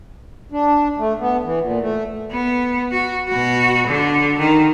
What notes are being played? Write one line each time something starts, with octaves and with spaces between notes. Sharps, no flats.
D4
A3
B3
E3
A#2
A3
B3
F#4
B2 F#4
D3
D#3